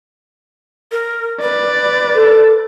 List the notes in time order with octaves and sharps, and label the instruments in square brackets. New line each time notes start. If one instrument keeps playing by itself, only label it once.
[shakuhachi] A#4
[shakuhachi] B4 [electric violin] D5
[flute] A4